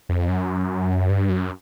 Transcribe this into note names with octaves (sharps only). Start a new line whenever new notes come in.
F2
F#2
G2
F#2